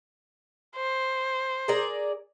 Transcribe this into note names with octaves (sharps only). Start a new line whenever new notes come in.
C5
G#4 A#4 D5